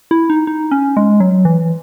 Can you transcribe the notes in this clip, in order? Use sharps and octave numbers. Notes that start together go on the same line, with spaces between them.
E4
D#4
D#4
C#4
G#3
F#3
E3